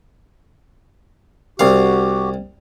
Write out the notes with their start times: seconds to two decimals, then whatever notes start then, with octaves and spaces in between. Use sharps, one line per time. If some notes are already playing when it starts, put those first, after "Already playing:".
1.59 C2 F#4 G4 F5